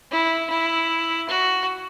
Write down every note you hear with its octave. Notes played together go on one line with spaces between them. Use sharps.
E4
E4
F#4